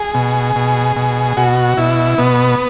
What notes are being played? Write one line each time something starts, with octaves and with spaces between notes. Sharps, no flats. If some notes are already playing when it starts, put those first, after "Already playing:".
Already playing: G#4
B2
B2
B2
B2 F#4
B2 E4
B2 B3